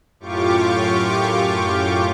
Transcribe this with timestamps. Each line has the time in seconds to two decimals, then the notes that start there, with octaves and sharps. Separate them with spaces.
0.20 F#2 A2 F4 G4 C#6 D6